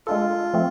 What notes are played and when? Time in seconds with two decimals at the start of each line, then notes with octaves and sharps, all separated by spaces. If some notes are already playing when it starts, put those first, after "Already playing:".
0.07 G#3 D4 F4 A4
0.54 F3 A3 C4